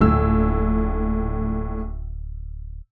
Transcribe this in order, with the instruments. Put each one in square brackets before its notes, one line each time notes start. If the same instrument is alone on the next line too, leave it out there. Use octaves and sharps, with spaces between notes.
[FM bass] D1 [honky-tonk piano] A#1 A2 E6